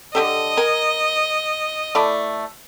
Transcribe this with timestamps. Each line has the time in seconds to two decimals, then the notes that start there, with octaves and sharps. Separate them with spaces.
0.15 D3 G4 A4 D#5
0.57 A#4 G#5
1.95 A3 E4 D5